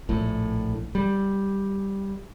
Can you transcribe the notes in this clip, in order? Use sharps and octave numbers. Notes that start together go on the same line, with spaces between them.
A#1 A2
G3